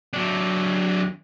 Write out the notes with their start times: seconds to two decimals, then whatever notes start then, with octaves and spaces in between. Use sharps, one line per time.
0.13 F#3 D4